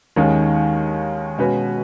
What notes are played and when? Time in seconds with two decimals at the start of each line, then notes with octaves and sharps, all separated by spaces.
0.16 D#2 D#3 G#3 C#4
1.38 B2 G#3 C#4 F#4 B4